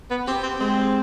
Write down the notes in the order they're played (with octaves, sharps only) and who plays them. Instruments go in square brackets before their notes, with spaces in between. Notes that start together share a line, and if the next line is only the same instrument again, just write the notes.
[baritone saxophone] B3
[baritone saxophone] C4 [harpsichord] G4
[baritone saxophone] C4
[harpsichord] G#3 [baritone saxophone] C4